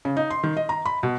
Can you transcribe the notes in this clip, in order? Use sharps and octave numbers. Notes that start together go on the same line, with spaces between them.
C#3
D#4
C6
D#3
D#5
A#5
B5
B2